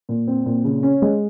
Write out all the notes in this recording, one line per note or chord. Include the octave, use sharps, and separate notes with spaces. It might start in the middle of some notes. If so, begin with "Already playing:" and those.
A#2
C4
A#2
C#3
C#4
G#3